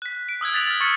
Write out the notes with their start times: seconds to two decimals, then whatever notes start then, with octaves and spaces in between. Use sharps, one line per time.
0.02 F#6 B6
0.29 D7
0.41 D#6 E6 F#6 G#6
0.54 A6 B6 F7 F#7
0.68 F6 B6
0.80 C#6 F6 A6 C#7